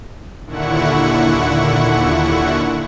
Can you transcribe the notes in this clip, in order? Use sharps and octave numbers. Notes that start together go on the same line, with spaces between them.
D#2 A#2 D3 E4 F#5 C#6